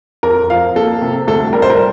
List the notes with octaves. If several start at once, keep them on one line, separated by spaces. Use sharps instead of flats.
F2 A#4
F3 F5
A#3 A4
C3
D2 A4
G3 A#4
C5
A#4